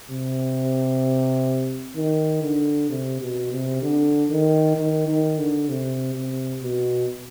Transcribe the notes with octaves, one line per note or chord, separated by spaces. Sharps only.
C3
D#3
D3
C3
B2
C3
D3
D#3
D#3
D#3
D3
C3
C3
B2